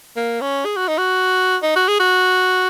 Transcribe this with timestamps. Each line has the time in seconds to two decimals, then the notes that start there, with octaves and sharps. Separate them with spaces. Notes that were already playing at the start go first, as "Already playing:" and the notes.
0.17 A#3
0.41 C#4
0.65 G#4
0.76 F#4
0.88 D#4
0.98 F#4
1.63 D#4
1.76 F#4
1.88 G#4
2.00 F#4